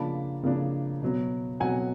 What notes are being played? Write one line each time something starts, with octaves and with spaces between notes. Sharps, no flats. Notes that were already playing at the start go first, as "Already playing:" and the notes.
Already playing: C#3 F3 A#3 D4 A5 B5
C#3 F3 A#3 D4
B2 F#3 B3
B2 F#3 B3 F#5 G#5